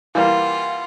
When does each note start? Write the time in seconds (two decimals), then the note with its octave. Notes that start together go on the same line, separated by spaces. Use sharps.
0.15 E3 G3 A#3 F4 F5 F#5